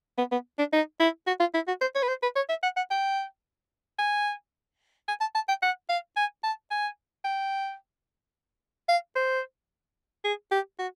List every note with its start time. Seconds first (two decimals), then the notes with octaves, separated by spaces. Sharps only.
0.18 B3
0.32 B3
0.59 D4
0.73 D#4
1.00 E4
1.27 F#4
1.40 F4
1.54 E4
1.68 F#4
1.81 C5
1.95 C#5
2.03 B4
2.08 C5
2.22 B4
2.36 C#5
2.49 E5
2.63 F#5
2.77 F#5
2.91 G5
3.99 G#5
5.08 G#5
5.21 A5
5.35 A5
5.48 G5
5.63 F#5
5.89 F5
6.17 G#5
6.44 A5
6.71 G#5
7.25 G5
8.89 F5
9.16 C5
10.24 G#4
10.51 G4
10.79 F#4